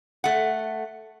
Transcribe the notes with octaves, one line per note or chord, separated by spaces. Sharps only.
A3 F#5